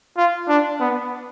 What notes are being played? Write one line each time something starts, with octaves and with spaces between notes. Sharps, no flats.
F4
D4
B3